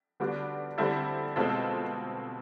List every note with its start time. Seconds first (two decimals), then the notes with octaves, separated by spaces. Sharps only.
0.20 D3 G3 B3 D4 F#4
0.78 D3 G3 C4 E4 A4
1.36 B2 G#3 C4 F4 A4